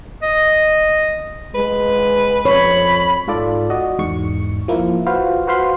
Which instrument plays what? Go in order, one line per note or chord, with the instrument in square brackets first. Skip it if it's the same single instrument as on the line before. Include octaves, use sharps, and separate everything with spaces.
[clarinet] D#5
[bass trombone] G#3 [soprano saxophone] B4
[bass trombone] F2 [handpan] C#5 [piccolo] B5
[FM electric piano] G#2 F4 A4 D5
F#4 D5 D#5
E2 G#2 C#6 C#7
F3 A#3 E4
F4 F#4 B4 C5 F5
F#4 B4 C5 F5 B5 C6